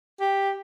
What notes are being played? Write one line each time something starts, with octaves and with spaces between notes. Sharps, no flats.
G4